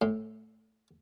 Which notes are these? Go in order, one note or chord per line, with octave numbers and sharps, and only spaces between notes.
A2